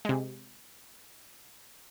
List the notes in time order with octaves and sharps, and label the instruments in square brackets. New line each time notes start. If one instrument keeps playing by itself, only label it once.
[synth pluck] C3 G#3